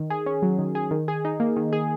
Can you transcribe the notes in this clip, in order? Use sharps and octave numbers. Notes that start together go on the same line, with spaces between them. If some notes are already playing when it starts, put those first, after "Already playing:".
Already playing: D#3
G#4
C#4
F#3
D#3
G#4
D#3
G#4
D#4
A#3
D#3
G#4